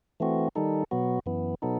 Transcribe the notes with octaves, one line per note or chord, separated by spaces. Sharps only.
E3 A3 C4 F#4
D#3 G3 D#4 A4
B2 F#3 B3 F#4
F#2 E3 B3
B2 F#3 B3 D#4 A4